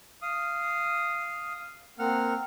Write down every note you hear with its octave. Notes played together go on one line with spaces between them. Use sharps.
F5 D#6
A#3 C4 F#5 F6